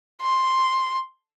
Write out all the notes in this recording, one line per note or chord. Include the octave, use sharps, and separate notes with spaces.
C6